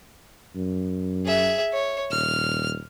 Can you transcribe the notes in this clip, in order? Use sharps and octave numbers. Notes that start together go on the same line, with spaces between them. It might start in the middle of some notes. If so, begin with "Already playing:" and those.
F#2
G#4 E5
C#5
D#1 F6